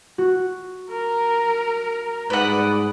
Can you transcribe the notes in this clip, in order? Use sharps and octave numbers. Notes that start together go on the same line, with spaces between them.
F#4
A#4
G#2 G3 G#4 B4 D5 F#5